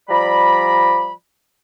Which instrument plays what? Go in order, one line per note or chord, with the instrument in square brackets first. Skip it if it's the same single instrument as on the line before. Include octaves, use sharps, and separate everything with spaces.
[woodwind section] F3 G3 D5 A#5 B5